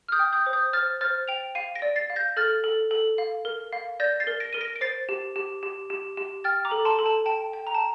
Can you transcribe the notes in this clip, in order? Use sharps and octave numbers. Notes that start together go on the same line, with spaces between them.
F6
D#6 G6
G5
D#6 G6
C5
D#6 G6
C5 F6 A6
C5 F6 A6
G5 D7 F7
F5 C7 D#7
A#6 D7
D5
A6 C7
F5
G6 A#6
A4 F6 A6
A4
A4
F5
A#4
F5
D5 G6 A#6
A6 C7
A#4
A#6 D7
A#4 D#7
A#6 D7
D7
C5 A6 C7
G4
G4
G4
G4
G4
G5 F6 A6
A#5 D6
A4
A5 C6
A4
A5
G5 A5
G5
A#5
A5